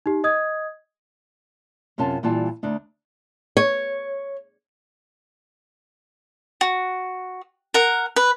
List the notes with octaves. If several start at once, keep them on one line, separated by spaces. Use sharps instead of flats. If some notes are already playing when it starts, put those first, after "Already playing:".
D#4 G4
D#5 D#6 G#6
F#2 C3 C#4 F4 A5
A#2 E3 G3 F4 A5
D2 D4 D#4
C#5
F#4
A#4 F#5
B4